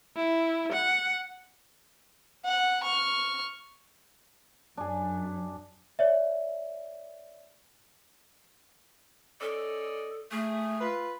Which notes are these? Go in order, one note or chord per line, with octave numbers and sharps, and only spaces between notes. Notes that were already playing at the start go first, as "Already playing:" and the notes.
E4
F#5
F#5
C#6 F6
F#2 D4 G#4
C#5 D5 E5
C#4 A4 D5 D#5
A3 G#4
F4 B4